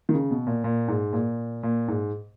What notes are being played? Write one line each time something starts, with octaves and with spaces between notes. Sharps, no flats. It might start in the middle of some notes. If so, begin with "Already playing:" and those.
D#3
C#3
B2
A#2
A#2
G#2
A#2
A#2
G#2